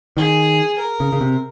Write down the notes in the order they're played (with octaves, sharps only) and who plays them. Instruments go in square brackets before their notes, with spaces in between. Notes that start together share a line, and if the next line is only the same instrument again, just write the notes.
[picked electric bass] D#3 [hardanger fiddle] G#4
[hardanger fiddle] A#4
[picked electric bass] C#3
C#3
C3